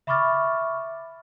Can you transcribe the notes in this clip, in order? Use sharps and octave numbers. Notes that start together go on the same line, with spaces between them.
E5 B5 C#6 D6 F6 A6